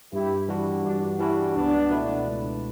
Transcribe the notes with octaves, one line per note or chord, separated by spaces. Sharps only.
G2 E4 G4
E3 G3 D4 F#4
G2 D4 F#4
E3 G3 C#4 D4 E4 F#4
C#2 B3 D4
B2 A3 E4 B4
C#2